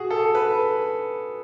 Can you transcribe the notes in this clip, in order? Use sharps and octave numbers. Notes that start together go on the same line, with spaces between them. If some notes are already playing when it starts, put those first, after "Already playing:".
Already playing: F#4 G#4
A4
B4